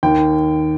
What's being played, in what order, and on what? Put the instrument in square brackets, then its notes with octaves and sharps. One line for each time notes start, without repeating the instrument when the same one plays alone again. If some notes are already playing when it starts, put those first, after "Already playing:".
[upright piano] D#2 D#3 G5